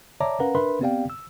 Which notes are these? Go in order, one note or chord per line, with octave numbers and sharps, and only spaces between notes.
C#5 D5 E5 A5 A#5 D6
C#4 A#4 B4 F5 F#5 A#5
D4 A#4 B4 E5 B5 C6
B3 C4 G4 D5 F5 G5
E6